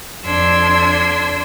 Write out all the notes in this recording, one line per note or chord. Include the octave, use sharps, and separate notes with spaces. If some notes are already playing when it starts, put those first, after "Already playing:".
F2 D4 C6 E6 G#6